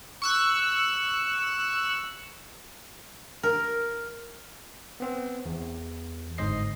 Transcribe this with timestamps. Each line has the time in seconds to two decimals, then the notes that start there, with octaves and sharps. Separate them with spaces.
0.22 C#6 E6 F#6
3.43 A#4
5.00 B3 C4
5.46 E2
6.38 G1 G#2 C5 D#5 C7